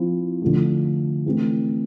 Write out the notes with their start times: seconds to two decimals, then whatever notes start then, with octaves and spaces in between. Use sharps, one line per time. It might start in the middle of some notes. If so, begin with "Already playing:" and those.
Already playing: F3 C4 E4
0.42 D3 F3 A3
1.26 E3 A3 C4